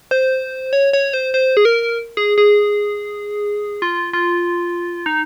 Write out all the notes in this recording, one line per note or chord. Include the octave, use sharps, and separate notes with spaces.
C5
C#5
C#5
C5
C5
G#4
A#4
G#4
G#4
F4
F4
D#4